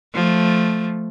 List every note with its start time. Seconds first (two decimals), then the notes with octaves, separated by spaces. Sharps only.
0.14 F3 A3